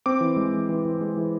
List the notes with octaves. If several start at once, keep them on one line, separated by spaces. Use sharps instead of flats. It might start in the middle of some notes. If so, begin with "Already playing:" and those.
C4 D6
E3
G#3
E3
E3
E3
G#3
E3